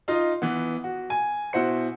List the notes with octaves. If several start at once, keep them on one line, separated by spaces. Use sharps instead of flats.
D#4 F4 D#5
E3 B3
F#4
G#5
B2 E4 F#4 C5 C#7